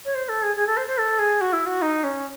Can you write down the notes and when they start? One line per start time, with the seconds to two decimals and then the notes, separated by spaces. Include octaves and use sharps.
0.05 C#5
0.15 C5
0.29 A4
0.43 G#4
0.56 G#4
0.67 A4
0.77 C5
0.88 C5
0.98 A4
1.19 G#4
1.41 F#4
1.53 E4
1.66 F#4
1.82 D#4
2.04 C#4